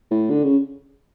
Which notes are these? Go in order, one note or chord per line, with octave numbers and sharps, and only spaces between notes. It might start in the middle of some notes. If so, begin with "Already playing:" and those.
A2
D3
C#3